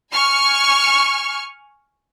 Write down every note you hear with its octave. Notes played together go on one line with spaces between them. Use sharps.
G#5 C#6 F6